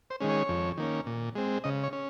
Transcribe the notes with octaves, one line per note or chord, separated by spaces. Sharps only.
C5
D#3 G#3 C#4
C#5
F2
D#3 A#3 C#4
A#2
G#3 C4
C#3 D#5
C#5
C#4